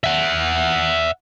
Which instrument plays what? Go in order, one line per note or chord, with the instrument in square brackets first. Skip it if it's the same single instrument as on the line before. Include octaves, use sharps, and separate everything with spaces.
[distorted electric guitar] E5 F#5